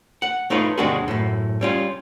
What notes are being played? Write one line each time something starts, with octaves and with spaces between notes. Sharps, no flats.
F#5
A3 D#4 F4 B4 C#5
D#2 C3 G#3 D4 F#4 G#4
F#2 A2
G3 C#4 F4